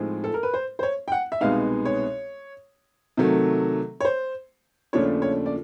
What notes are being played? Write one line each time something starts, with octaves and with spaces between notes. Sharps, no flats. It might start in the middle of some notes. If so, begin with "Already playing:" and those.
Already playing: A2 F3 G#3 C4 D#4
A4
A#4
B4
C5
C5
C#5
G5
F#5
E5
C2 B2 G#3 B3 D#4 F5
C#5
C3 D#3 F#3 A3
C#5
C5
D#2 C#3 F3 A3 D4 C#5
C#5
D5